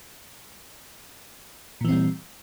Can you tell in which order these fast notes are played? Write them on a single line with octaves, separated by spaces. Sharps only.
A#2 E3 C4 G3